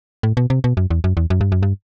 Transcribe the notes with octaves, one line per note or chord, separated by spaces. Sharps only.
A2
B2
C3
B2
F#2
E2
F#2
E2
F#2
G2
F#2
G2